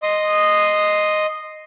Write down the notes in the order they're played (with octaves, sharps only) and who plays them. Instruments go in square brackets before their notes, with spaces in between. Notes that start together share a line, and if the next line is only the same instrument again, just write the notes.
[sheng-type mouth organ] D#5 C6 D#6